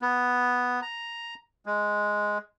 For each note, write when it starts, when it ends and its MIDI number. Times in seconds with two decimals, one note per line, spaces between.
0.02 0.80 59
0.82 1.34 82
1.66 2.38 56